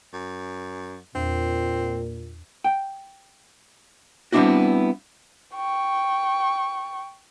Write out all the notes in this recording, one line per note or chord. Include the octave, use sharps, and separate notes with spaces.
F#2
E2 A#2 C4
G5
G3 B3 C4 D4 E4 F#4
G5 C#6